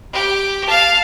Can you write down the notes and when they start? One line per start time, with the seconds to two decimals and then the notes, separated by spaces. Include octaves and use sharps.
0.13 G4
0.66 F5 A5